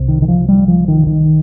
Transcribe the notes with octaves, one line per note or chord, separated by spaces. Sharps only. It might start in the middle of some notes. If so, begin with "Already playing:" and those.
Already playing: C2 C3
D#3
D#3
F3
G3
F3
D#3
D#3